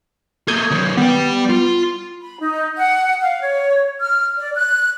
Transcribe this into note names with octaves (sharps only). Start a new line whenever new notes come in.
A#3 A4 D#6 G6 G#6
D#3 F#3
G3 B3 G5
F4
B5
D#4
F#5
F5
C#5
F6
D5
F#6